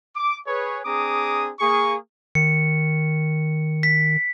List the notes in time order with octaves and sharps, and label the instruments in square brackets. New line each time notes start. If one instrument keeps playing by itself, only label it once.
[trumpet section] D6
G#4 B4 C#5
C4 D4 G#4 A#5 D6 D#6
A#3 G#4 C#6
[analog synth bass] D#3 [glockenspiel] C#7
[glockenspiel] B6